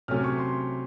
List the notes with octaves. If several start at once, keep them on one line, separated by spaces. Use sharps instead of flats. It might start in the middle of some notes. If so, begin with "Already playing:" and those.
C3 F#3 A3 C#4 F6
C#6
C6